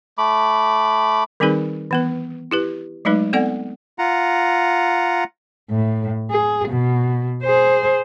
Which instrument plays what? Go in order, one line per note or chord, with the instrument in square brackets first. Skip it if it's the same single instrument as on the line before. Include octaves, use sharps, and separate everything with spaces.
[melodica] A3 B5 D6
[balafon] D#3 G3 C4 D#4 G#4 B4
E3 B3 B4
E4 G4 B4
F#3 G#3 A3 D#4 B4
B3 C4 A4 D5 F#5
[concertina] F4 F#5 A#5
[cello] A2
G#4
B2
G#4 C5